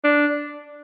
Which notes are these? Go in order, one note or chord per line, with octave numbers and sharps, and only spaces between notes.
D4